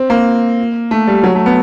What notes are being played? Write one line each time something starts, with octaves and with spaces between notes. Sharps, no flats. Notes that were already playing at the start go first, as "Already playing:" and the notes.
Already playing: C4
A#3
A3
G3
F#3
A3
B3